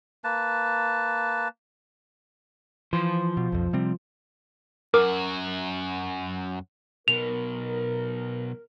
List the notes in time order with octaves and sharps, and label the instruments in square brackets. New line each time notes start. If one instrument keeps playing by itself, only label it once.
[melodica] A#3 B4 A5
[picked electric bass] E3 [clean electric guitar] F3 C5
[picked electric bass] B2
B1 F2
C3 G3 C4
[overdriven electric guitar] F#2 F#4 [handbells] A#4 D6
[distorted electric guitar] B1 B2 [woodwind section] A#4 [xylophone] F7